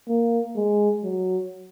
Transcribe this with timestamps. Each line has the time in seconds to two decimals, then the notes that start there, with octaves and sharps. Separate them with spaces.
0.09 A#3
0.56 G#3
1.04 F#3